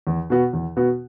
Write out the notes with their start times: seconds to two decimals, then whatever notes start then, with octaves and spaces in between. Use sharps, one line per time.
0.07 E2
0.30 B2 B3 F#4
0.53 E2
0.76 B2 B3 F#4